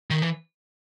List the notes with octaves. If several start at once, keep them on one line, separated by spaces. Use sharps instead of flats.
D#3
E3